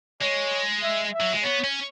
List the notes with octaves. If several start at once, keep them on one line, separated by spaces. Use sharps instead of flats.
G#3 C#5
E5
E5
F#3
G#3
B3 C#5
C#4